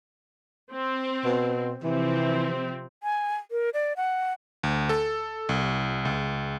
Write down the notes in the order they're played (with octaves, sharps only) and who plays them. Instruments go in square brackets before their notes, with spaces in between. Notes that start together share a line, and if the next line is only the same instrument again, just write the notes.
[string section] C4
[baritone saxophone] B2
[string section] C3 F3 C4 [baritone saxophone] E3
[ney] G#5
A#4
D5
F#5
[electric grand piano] D2
A4
C2
C#2